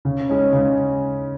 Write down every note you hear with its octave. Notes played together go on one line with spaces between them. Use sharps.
C#3
G#3 C#4
C#3